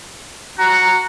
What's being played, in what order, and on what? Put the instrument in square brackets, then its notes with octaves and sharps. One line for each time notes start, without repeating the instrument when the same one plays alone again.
[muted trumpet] F#4 [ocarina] A#5